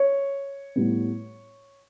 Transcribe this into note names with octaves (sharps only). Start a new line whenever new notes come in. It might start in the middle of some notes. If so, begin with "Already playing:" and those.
Already playing: C#5
A2 G3 B3